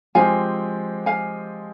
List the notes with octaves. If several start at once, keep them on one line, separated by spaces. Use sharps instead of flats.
F3 G#3 C4 G4 F5 G#5
F5 G#5